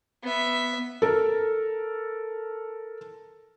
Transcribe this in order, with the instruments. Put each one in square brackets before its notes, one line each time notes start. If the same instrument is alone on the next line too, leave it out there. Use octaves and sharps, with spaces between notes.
[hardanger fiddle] B3 E5
[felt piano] A4 A#4